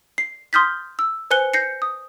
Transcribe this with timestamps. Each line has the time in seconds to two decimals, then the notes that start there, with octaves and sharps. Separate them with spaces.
0.18 C7
0.53 C6 D#6 F6 G6 A6 B6
0.99 E6
1.31 B4 C5 G#5 F#6 C#7 G7
1.54 G6 A#6 C7 C#7
1.82 D#6